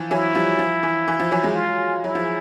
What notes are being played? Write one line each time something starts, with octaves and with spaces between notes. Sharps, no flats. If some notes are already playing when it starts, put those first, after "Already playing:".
Already playing: E3 F3
E3 F#3 E4
F3 G3
F3
E3
E3
F3
E3 F#3
F#3 G#3
F4
F#3 E4
F3